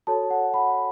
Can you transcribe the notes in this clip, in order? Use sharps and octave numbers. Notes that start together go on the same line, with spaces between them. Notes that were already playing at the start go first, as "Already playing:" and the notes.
F#4 A4 C#5 A5
F#5
F#5 B5